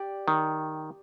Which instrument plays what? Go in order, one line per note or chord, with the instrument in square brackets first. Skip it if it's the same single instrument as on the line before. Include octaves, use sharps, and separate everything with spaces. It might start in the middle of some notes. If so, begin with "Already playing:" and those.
Already playing: [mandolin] G4 D5
[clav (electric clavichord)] D#3